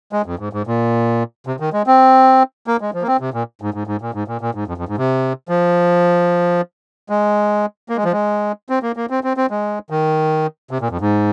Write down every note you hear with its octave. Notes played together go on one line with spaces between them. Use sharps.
G#3
F2
G#2
G#2
A#2
C3
D#3
G#3
C4
A#3
G#3
F3
A#3
C4
C3
A#2
G#2
G#2
G#2
A#2
G#2
A#2
A#2
G#2
F2
F2
G#2
C3
F3
G#3
A#3
G#3
F3
G#3
C4
A#3
A#3
C4
C4
C4
G#3
D#3
C3
A#2
F2
G#2